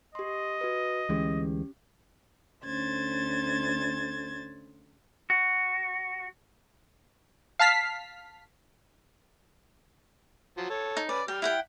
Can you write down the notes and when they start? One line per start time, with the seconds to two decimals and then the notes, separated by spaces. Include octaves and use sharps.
0.15 G4 D#5 C6
0.61 F#4 B4
1.09 D2 E3 G#3 C#4 G4
2.65 D2 C#4 C5 G#6 A6
5.30 F#4
7.59 F5 A5 F6 B6 C7
10.57 F3 F#3
10.70 A4 C#5
10.97 D#4
11.09 C#4 B4 D5
11.28 G3 G5 F6
11.42 E4 F#5 G5